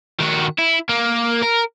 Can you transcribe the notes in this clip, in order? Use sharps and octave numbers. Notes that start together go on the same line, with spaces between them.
D#3 F#4
E4
A#3
A#4